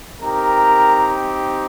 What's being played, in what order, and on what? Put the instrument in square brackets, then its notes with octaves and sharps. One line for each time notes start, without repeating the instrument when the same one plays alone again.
[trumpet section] C4 D#4 G4 A#4 A#5